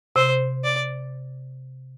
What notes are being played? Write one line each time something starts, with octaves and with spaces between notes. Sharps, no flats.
C3 C5
D5